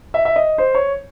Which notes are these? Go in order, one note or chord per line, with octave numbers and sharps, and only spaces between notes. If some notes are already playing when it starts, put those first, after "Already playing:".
E5
E5
D#5
C5
C#5